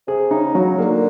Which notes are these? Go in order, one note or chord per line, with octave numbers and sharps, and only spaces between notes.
C3 G#4
C#3 D#4
C#3 F#3
D3 A#3